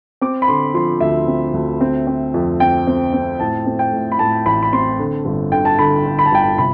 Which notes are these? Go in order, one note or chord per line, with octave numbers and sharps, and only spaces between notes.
C4 D6
B5
D3 C6
F3 C6
D2 E5
C4
D2
C4
C4
F2
C4 G5
C4
C4
A2 A5
C4
G5
A2
B5
A2 A5
A1 B5
B5
C4 C6
D3
G1
D3 G5
A5
D3 B5
D3
B5
A5
G1 G5
A5
C3 B5